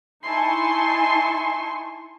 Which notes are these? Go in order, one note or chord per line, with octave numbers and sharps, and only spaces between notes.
D#4 E4 G#5 A5 C6 C#6